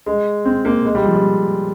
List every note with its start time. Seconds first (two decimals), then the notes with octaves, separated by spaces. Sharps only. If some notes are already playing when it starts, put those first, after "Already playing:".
0.06 G#3
0.45 C4
0.65 A#3
0.85 G#3
0.95 G3
1.05 F3
1.15 G3